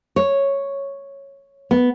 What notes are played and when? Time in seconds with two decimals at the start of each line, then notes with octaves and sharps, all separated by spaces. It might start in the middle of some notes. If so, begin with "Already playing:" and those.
0.16 C#5
1.71 B3